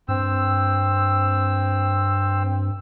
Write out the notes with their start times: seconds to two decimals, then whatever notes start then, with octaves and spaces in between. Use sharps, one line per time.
0.08 G2 C4 E6